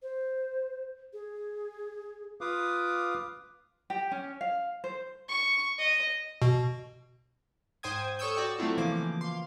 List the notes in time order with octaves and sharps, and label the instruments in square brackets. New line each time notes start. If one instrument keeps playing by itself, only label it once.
[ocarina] C5
G#4
[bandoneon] F4 B4 F5 D6 D#6
[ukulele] G4
C#4
F5
C5
[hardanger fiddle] C#6
D#5
[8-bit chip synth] B2
[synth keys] G#2 C5 G5 D#6 G#6
A4 C#5 C#6 D#6 E6 G6
F#4 D5 G5 C#6 E6
F#3 A3 C4 E4 F4
C#3 E3 F3 A#3 D6
F5 C6